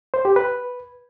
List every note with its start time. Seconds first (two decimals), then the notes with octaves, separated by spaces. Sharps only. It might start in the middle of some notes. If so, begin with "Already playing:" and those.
0.14 C5
0.25 G4
0.36 B4